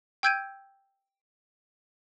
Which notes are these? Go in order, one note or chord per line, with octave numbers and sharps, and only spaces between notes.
G5 E6 G6 G#6 D7 D#7